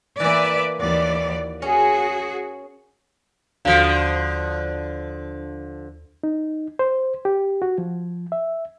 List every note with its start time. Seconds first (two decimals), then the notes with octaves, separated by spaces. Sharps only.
0.20 E3 A#3 B4 D5 E5
0.80 D#2 E3 F#4 D5
1.62 C#4 F#4 G#4
3.65 D#2 D3 F3 F#4 F5
6.23 D#4
6.79 C5
7.25 G4
7.62 F#4
7.78 F3
8.32 E5